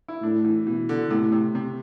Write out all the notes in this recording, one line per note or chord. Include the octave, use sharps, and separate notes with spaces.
E4
A2 D4
E3
B2 E3
D3
A2 C3
C3
C3